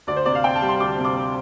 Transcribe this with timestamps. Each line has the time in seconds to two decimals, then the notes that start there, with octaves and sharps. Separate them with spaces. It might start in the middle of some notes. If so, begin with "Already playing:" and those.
0.07 D2 D5
0.16 C5
0.25 C3 D5
0.35 F5
0.44 C4 G5
0.56 A5
0.62 G3
0.68 C6
0.80 D2 D6
0.98 C3
1.05 D6
1.17 C4